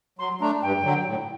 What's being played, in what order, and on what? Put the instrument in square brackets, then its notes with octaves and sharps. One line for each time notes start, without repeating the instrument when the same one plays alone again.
[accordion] F#3 [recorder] C6
[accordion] A3 D4 [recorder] A#5
[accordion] G2 [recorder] G5
[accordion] D3 F#3
A2